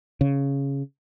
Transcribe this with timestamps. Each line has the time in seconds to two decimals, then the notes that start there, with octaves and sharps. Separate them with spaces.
0.21 C#3